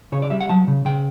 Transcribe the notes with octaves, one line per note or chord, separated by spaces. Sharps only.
C#3 C#5
D5
G3 E5
F#5
F#3 A5
C#3
C#3 G5